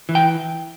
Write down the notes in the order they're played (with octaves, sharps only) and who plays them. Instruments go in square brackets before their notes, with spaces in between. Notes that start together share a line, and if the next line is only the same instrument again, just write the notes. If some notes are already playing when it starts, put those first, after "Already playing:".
[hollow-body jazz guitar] E3
G5